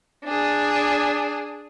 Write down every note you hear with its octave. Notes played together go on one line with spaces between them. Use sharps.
D4 G#4